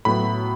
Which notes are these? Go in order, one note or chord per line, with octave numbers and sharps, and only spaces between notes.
A2 F#3 B3 B5